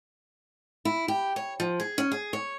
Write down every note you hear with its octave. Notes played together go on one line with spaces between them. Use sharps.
E4
G4
C#5
F3
G#4
C#4
G#4
C#5